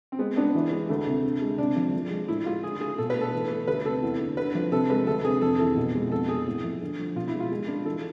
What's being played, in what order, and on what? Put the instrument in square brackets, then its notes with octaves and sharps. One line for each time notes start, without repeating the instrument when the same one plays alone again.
[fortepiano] C4
[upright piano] G#3 [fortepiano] B3
[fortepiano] B3 [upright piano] D4
[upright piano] E3
G#3
[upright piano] D2 [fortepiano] A3
[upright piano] C3
D3
G#3
[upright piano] C3 [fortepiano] D4
[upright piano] F3
F3
G#3
[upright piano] A2 [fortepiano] E4
[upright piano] G#3 [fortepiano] F4
[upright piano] D3 [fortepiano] G#4
[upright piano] A3 [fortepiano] G#4
[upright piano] B2 [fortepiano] A4
[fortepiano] B4
[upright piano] A3
[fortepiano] A4
[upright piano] E3
A3
[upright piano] D2 [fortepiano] B4
[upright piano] C3 [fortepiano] A4
[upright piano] E2
D3
[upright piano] D3 [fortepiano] B4
[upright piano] F3
[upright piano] C3 [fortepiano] A4
[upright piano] G#3 [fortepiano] B4
[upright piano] D2 [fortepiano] A4
[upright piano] C3 [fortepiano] G#4
[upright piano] F2 [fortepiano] A4
[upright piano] E3 [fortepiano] A4
[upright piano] B2
G#3
[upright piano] F2 [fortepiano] A4
[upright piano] C3 [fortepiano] G#4
[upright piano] A2
F3
D3
F3
[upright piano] B2 [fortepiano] F4
[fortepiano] E4
[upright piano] G#3
[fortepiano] F4
[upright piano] G#3
D4
[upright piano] E3 [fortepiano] A4